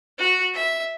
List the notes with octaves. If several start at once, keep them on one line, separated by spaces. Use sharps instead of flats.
F#4
E5